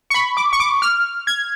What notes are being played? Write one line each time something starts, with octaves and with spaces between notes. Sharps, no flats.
C#6
B5
D6
C#6
D6
F6
G#6